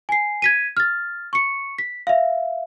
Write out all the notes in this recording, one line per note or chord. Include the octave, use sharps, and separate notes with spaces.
G#5 C7
G#6 B6 D#7
F6 A6
C#6 C#7
B6
E5 F5